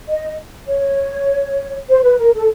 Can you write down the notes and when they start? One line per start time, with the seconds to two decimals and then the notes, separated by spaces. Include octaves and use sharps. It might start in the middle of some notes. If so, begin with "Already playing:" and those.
0.08 D#5
0.68 C#5
1.88 C5
2.03 B4
2.18 A#4
2.33 A4